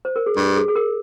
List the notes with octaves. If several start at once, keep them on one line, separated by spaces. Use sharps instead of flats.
C5
A#4
G#4
G2 G4
G#4
G#4
A#4